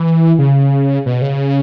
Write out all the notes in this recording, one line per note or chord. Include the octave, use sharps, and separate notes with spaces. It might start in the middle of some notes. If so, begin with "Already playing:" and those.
Already playing: E3
C#3
B2
C#3